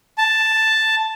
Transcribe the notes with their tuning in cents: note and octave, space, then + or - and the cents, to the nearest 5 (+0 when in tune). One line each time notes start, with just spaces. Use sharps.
A5 +5